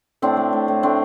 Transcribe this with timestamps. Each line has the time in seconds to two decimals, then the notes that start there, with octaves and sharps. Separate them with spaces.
0.22 A2 C4 D4
0.37 A3
0.53 A2
0.68 A2
0.83 A3 C4 D4